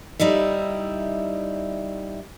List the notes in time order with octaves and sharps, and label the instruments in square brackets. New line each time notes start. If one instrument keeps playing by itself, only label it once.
[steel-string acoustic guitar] G3 D#4 E4 E5